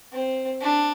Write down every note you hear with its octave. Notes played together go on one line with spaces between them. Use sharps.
C4
D4